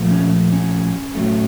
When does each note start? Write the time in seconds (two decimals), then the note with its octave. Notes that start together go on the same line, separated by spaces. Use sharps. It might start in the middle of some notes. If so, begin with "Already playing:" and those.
Already playing: A#2 F3 A3
0.11 C#4
0.52 C#4
1.15 A2 F#3 A3